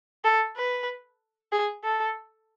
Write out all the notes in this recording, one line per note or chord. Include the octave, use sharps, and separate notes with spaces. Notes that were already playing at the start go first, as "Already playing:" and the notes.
A4
B4
G#4
A4